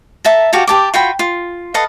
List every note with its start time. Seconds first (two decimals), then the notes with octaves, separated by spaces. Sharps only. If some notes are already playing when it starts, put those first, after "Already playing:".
0.25 E5 A5 A#5
0.53 F#4 G4 F5 A5
0.67 G4 A5 D6
0.94 F4 F#4 G5 B5
1.19 F4
1.74 A4 B4 D#5 F5